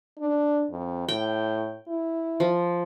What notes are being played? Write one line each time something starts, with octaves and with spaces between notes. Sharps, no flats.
D4
F2
A2 G5
E4
F3